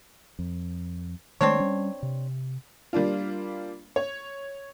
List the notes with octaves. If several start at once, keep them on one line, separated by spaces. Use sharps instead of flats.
F2
D#3 G#3 A3 C4 D4 C#5
G3 C#4
C3
G3 A#3 D4 F4
C#5